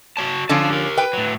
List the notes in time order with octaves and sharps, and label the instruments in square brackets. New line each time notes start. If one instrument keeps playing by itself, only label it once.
[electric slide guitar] F#4 C#5 A5
[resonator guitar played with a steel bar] D3 F3 C#4 [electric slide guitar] F5 A5
[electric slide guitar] G4 A#4
[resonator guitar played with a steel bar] B4 G5
[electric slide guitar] A2 F#3